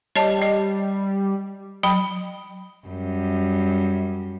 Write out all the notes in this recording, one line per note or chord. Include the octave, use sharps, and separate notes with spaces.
G3 C#5 D#5 A5
D#5
F#3 G5 B5
F#2 G3